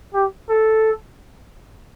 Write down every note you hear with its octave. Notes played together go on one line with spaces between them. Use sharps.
G4
A4